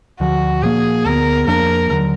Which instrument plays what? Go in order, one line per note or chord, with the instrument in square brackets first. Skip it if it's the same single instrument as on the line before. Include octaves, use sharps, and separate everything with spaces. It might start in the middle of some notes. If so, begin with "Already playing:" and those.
[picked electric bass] D2 D3 F3 [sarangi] F#4
[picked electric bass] A#2 F3 A#3 [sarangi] G#4
[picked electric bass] D2 D3 F#3 B3 [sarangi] A#4
[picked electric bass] F2 F3 A#3 D4 [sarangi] A#4
[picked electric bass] D#2 D3 F#3